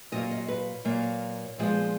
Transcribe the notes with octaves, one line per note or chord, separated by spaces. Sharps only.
A#2 F#3 A#3 D#5
D#5
B4
A#2 F#3 A#3
A#2 F3 G#3 B3